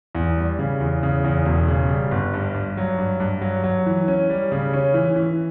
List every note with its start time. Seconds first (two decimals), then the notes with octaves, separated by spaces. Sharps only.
0.15 E2
0.37 G3
0.59 C#3
0.80 E2
1.03 C#3
1.24 E2
1.46 E1
1.68 C#3
1.90 G3
2.11 G1
2.34 G2
2.54 G2
2.77 F#3
2.98 G2
3.20 G2
3.42 F#3
3.64 F#3
3.86 E3
4.08 C#4
4.30 G3
4.52 C#3
4.73 C#4
4.94 E3
5.16 E3